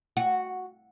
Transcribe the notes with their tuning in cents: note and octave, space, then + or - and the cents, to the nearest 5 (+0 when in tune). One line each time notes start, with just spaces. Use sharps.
F#4 -5